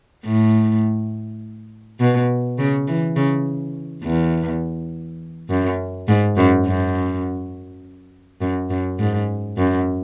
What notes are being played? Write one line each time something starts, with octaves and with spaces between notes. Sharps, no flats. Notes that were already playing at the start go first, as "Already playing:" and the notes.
A2
B2
C#3
E3
C#3
E2
F#2
G#2
F#2
F#2
F#2
F#2
G#2
F#2